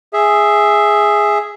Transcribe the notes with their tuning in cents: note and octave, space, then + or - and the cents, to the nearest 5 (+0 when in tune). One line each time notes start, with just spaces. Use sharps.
G#4 +0 E5 +0